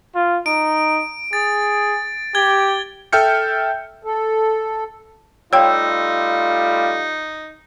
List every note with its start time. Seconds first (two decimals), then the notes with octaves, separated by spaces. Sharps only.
0.15 F4
0.46 D#4 D7
1.33 G#4 A6
2.35 G4 G#6 G7
3.12 A4 E5 G5 F6 G6 C#7
4.04 A4
5.53 G3 A3 D#4 F4 C#5 G5 E6